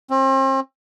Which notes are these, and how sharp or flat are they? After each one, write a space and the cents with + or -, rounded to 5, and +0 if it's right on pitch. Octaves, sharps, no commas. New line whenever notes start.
C4 +40